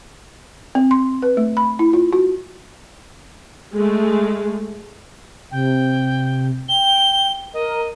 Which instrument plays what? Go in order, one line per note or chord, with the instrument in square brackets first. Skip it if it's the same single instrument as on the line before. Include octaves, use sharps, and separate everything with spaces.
[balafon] C4
C6
B4
A3
B5
E4
F4
F#4
[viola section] G#3 A3
[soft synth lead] C3 [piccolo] G5
[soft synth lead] G5 [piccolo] G7
[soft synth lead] A#4 [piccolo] D#5